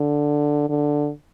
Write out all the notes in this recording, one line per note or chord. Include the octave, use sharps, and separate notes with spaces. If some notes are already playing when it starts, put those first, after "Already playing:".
Already playing: D3
D3